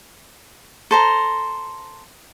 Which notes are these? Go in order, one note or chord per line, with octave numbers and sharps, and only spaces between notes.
A4 C5 A#5